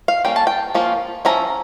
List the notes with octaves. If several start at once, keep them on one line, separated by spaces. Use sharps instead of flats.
F5
G3 A#3 C#4 G5
A5
G5
F3 A#3 C#4 F4
F3 C#4 E4 A#5